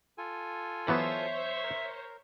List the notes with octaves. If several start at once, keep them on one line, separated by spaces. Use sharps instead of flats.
F4 A4 G#5
E3 F#3 B3 C5 C#5 E5
A#4